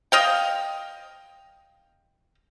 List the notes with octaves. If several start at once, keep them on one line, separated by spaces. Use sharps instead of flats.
D#5 F5 G5